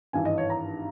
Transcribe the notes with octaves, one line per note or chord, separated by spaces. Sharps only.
G#1 G2 E3 G#5
D#5
C#5
A#5